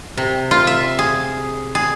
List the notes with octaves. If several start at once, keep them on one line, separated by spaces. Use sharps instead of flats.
C3
F4
E5
G#4
G#4